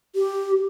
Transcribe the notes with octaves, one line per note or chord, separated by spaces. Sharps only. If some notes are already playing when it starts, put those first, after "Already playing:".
G4